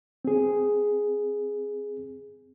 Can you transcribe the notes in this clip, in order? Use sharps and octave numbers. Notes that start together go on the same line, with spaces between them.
C4 G#4